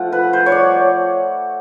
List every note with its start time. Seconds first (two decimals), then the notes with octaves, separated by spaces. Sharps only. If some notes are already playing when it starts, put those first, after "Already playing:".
Already playing: F3 A3 F#5
0.12 B4
0.33 C5
0.46 C#5
0.52 D5